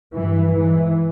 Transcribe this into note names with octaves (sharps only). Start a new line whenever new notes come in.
G2 E3
G#2 E3